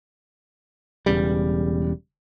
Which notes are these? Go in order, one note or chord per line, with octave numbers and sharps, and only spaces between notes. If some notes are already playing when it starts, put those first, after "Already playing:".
E1 E2 C#3 G3